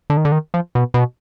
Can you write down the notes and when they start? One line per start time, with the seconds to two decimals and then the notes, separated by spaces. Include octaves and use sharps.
0.10 D3
0.17 D#3
0.25 D3
0.32 D#3
0.54 F3
0.75 B2
0.94 B2